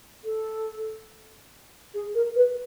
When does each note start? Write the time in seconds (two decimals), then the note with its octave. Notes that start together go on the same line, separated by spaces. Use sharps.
0.24 A4
1.93 G#4
2.14 A#4
2.35 B4